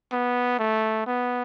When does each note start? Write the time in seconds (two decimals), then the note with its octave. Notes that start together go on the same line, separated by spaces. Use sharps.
0.12 B3
0.59 A3
1.06 B3